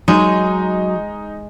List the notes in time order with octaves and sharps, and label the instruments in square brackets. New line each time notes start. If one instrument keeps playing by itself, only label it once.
[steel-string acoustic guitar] F#3 [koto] G#3 [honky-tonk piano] D#4